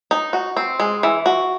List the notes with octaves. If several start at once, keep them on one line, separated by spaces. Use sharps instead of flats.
D#4
F#4
C4
G#3
E3
F#4